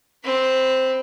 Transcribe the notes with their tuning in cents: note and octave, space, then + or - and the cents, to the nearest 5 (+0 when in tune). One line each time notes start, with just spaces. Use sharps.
C4 +0 B5 +25